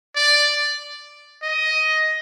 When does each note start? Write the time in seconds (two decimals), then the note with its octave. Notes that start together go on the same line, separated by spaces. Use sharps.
0.16 D5
1.43 D#5